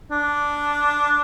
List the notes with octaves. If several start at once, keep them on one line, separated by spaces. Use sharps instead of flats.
D4